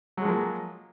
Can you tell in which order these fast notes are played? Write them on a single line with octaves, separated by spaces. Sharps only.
F#3 G#3 F3 A#3